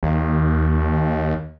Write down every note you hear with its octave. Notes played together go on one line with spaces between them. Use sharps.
D#2